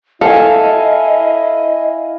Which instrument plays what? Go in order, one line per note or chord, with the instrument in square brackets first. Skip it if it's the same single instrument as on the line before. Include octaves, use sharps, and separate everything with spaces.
[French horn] E4 [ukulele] A4 [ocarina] D#5 [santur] F5 G#5